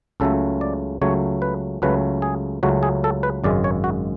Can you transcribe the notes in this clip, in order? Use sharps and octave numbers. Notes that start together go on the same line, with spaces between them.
C#2 C#3 F#3 A3 A4
D5
C#2 C#3 F#3 A3 C#5
B4
C#2 C#3 F#3 A3 B4
G#4
C#2 C#3 F#3 A3 F#4
G#4
A4
B4
G#1 F#2 C#3 G#3 D5
C#5
F#4